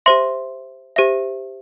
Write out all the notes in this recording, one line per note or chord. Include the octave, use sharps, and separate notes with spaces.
G4 C5 E5 C6
G4 C5 E5